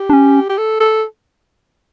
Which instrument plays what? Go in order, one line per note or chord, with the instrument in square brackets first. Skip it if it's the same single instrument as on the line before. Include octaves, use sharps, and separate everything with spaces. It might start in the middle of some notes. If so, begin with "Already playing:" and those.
Already playing: [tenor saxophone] G4
[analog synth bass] D4
C#4
[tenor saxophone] G4
A4
A4